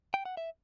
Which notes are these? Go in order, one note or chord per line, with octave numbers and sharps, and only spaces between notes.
G5
F#5
E5